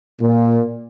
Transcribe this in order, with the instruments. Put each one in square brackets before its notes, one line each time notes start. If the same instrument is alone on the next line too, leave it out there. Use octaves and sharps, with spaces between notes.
[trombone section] A#2